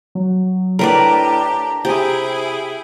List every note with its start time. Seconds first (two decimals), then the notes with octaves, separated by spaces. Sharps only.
0.15 F#3
0.79 A2 D4 G4 A#4 B4 D5 A#5
1.85 C3 E4 G4 G#4 G5